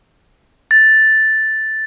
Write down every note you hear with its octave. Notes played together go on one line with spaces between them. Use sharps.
A6